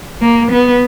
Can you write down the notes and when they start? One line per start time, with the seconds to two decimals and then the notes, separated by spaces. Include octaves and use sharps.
0.22 A#3
0.52 B3